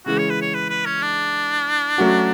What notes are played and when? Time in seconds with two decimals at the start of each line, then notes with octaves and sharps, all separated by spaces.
0.06 C#3 E3 G#3 F#4
0.18 C#5
0.30 B4
0.42 C#5
0.54 B4
0.69 B4
0.85 C#4
1.02 D4
1.98 F#3 A3 C#4 F#4